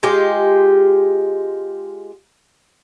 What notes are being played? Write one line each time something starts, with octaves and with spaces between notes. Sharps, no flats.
G#3 F4 G4